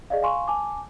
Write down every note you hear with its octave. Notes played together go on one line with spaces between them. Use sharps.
G#4 D5 D#5 F5
F5 G#5 C6 C#6
G#5 A5 D6